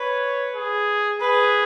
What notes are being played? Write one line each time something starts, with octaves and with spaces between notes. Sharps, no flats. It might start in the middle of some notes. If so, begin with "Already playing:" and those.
Already playing: B4 C#5
G#4
G#4 B4